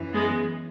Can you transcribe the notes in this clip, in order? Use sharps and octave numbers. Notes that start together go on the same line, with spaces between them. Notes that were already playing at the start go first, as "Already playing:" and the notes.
Already playing: F#2 E3
G#3 B3